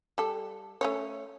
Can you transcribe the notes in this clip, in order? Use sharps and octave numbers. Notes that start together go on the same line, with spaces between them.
G3 A4
A3 C#4 C#5